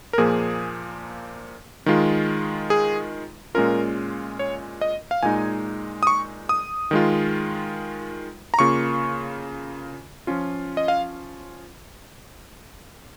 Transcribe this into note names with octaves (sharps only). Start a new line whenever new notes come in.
A#4
A#2 F3 A#3 G#4
D#3 G#3 F4
G#4
A#2 G#3 C#4 F4 A#4
C#5
D#5
F5
A#2 G#3 D#4 G#5
D#6
C#6
D#6
D#3 G#3 F4
A#5
C#3 A#3 F4 C#6
F3 C#4 F4
D#5
F5